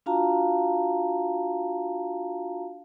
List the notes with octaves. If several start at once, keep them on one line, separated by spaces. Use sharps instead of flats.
D4 F4 F#4 F5 A5 A#5